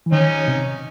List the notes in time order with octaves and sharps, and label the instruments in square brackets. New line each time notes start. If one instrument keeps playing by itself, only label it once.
[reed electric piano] E3
[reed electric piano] D#3 [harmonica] C#4 D#4
[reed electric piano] C3